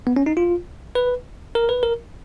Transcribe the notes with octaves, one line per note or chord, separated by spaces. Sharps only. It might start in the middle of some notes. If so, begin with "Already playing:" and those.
B3
C#4
D#4
F4
B4
A#4
B4
A#4